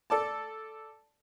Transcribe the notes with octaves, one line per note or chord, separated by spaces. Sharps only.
A4 D5 A5